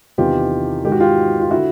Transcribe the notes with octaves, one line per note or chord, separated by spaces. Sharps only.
E2 C3 D#3 F4 G4
G#2 D#3 G4
F#4
F4 G4
F4
D3 E4 F#4